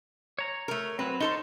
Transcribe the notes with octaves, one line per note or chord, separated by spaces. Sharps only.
C#5 A#5
A3 A#4
F#3 C4 B4
D#4 A4 A#4 C5 C#5 C6